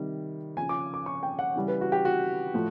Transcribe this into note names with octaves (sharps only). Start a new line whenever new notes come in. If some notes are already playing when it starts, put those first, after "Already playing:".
Already playing: C3 D#3 G3
C#3 F3 G#5
D6
D6
C#6
G5
F#5
C#3 E3 G3
B4
F#4
G4
F#4
A2 F3